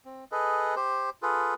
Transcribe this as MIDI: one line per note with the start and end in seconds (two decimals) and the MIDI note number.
0.05 0.25 60
0.32 0.75 68
0.32 0.75 69
0.32 0.75 71
0.32 0.75 75
0.76 1.10 67
0.76 1.10 72
1.23 1.54 65
1.23 1.54 68
1.23 1.54 69
1.23 1.54 71